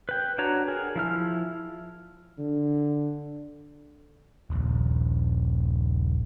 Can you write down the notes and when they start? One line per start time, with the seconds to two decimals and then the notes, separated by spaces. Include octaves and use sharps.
0.09 B4 G5
0.38 D4 F#4 B4 C#5 A#5
0.68 G#4 A#4
0.96 F3 E4 F6
2.39 D3
4.50 D#1 A#1